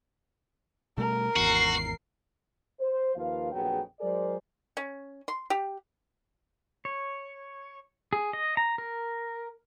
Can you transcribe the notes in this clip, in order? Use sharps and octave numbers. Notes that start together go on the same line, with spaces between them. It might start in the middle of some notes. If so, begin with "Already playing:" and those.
B2 G3 A3 A#4
G#1 E2 F#4 C7
C5
D#2 F3 F4 A#4 B4 F5
A#1 F2 F#3 B3 G#4 G5
F#3 G#3 G#4 A#4 C5 D5
C#4
C6
G4
C#5
G#4
D#5
A#5
A#4